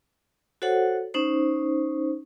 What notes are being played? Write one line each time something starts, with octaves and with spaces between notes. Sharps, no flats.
F#4 A4 C5 C#5 F#5
C#4 D#4 C5